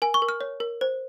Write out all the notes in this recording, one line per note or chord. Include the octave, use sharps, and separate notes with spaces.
A#4 G#5
C#6
A#4
F6
C#5
A#4
C5